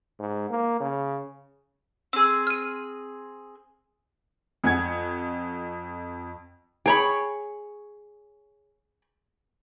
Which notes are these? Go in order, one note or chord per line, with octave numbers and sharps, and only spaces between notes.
G#2
A#3
C#3
C4 G#4 E6
F6 D#7
F2 F#5 G#5 G#6
G#4 C#5 G5 A#5 B5